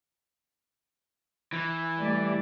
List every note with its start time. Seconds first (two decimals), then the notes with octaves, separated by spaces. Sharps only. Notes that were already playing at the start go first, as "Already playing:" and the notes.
1.53 E3
1.99 G3 A3 D5